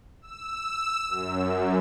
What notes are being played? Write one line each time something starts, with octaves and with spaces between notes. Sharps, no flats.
E6
F#2